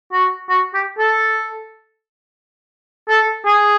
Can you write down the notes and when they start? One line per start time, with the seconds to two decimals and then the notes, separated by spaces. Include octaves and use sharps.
0.13 F#4
0.49 F#4
0.74 G4
0.98 A4
3.09 A4
3.46 G#4